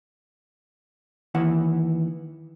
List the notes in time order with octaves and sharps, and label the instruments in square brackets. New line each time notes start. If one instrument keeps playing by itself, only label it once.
[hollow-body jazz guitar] D#2 E3 F#5